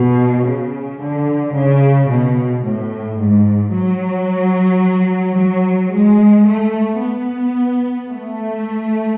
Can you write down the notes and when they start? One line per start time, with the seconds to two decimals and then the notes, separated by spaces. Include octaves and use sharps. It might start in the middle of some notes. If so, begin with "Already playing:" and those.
Already playing: B2
0.45 C#3
0.99 D3
1.53 C#3
2.09 B2
2.63 A2
3.18 G#2
3.73 F#3
5.36 F#3
5.91 G#3
6.46 A3
7.00 B3
8.10 A3